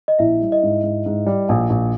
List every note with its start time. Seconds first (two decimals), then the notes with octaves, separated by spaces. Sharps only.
0.08 D#5
0.19 A#1 E4 E5
0.41 G3
0.52 D#5
0.63 G#2
0.83 G#2
1.06 G#2
1.26 G3
1.49 A#1
1.70 A#1